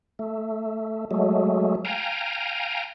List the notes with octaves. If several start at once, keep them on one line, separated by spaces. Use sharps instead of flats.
A3
F#3 G#3 A3
F5 G5 G#5 A#5